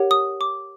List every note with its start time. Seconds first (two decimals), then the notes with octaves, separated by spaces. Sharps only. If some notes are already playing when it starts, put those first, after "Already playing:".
Already playing: G4 A#4 C#5 F#5
0.11 D#6
0.41 D6